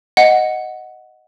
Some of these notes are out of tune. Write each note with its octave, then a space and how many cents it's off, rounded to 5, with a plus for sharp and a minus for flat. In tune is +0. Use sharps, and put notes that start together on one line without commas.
D#5 +0 F#5 +0